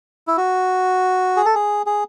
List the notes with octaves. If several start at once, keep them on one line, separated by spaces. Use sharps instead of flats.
E4
F#4
G#4
A4
G#4
G#4